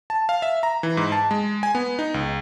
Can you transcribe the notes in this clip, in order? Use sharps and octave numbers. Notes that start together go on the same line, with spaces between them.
A5
F5
E5
A#5
E3
G#2
A5
G#3
G#5
B3
D#4
C#2